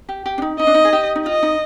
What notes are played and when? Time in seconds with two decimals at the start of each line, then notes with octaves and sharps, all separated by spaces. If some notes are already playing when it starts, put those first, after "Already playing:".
0.09 G4
0.26 G4
0.38 D4
0.42 D#4
0.59 D#4 D#5
0.67 D4
0.74 D#4
0.85 G#4
0.93 G4
1.15 D#4
1.26 F4 D#5
1.43 D#4